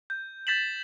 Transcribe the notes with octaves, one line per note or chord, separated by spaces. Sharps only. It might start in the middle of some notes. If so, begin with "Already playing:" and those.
G6
G6 A6 B6 E7 F#7